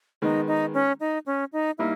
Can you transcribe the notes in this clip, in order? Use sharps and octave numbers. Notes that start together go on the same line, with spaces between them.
D#3 G#3 B3 D#4
D#4
C#4
D#4
C#4
D#4
G3 A#3 D#4 E4